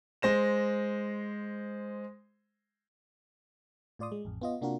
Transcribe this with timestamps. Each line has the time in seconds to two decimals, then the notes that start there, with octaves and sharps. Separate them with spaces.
0.22 G#3 C5 A#6 E7
3.99 A2 F4 D5 C6 D#6
4.12 G#3
4.25 A1 F2
4.42 B3 F4 D#5
4.61 C3 A#3 D4 F4 F#4 A#4